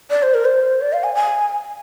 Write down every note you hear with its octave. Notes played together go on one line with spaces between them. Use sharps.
D5
C5
A#4
C5
D5
F5
G#5
G#5